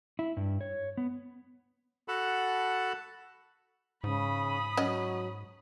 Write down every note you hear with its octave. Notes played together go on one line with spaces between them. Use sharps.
E4
G2
C#5
B3
F#4 A4 F#5 A5 B5
G#2 C#3 B5 D#6
F#3 C#4 F#4 D#5